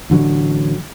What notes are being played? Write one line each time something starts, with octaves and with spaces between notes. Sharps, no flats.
A1 D3 F#3